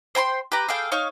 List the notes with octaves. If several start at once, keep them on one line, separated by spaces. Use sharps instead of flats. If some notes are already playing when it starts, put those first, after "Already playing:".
C5 G5 B5 C6
G4 B4 A#5
G#4 A4 F5 G5
D#4 C#5 F5 C#6